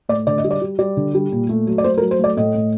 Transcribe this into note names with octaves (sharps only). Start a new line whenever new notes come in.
A2 D5
D3 D5
D#5
G3
D5
G3
G3 D5
D3
G3
A#2
A3
F#3
D5
A3 C5
A#4
F#3
C5
A3 D5
A2 D#5
A2